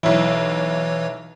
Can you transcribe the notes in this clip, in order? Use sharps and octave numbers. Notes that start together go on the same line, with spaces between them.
B1 E3 E4 C#5